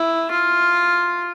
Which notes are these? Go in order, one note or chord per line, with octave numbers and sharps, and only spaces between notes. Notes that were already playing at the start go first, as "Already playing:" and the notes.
Already playing: E4
F4